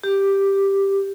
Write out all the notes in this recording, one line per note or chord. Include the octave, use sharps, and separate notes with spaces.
G4